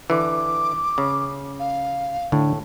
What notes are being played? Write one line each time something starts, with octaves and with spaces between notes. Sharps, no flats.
D3 E3 D6
C#3
F5
A2 D3